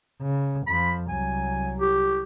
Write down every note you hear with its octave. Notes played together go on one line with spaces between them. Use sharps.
C#3
F2 F3 B5
C2 F#3 G#5
G4